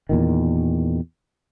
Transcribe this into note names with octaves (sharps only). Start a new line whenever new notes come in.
E2 A#2 D#3